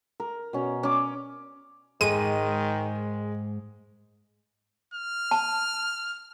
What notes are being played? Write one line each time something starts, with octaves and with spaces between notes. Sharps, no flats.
A#4
B2 C#4
C#4 D6
G#2 D#3 G#3 D#7
F6
A5